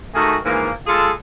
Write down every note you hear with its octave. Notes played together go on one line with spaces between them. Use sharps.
D#3 A3 F#4 G#4
G#2 E3 F3 A#3
G#3 F4 G#4 A4